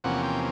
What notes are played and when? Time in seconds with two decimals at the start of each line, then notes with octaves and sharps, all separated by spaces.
0.04 E2 C3 F3 A#3 C#4 F#5
0.24 G5